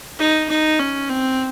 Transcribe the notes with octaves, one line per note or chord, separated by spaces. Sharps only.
D#4
D#4
C#4
C4